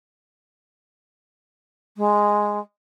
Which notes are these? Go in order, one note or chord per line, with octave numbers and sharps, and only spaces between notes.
G#3